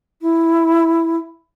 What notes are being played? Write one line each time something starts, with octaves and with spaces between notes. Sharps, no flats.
E4